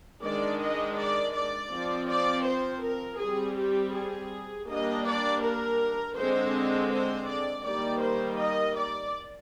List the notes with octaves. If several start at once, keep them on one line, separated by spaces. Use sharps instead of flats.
D#3 G#3 D4 D5
D#5
D5
D5
F3 C4
D5
C5
A#4
G3 C4 G#4
G4
G#4
G3 A#3 D4 D#5
D5
A#4
D3 G#3 C4 C5
C5
D5
D#3 G3 A#3 D5
C5
D#5
D5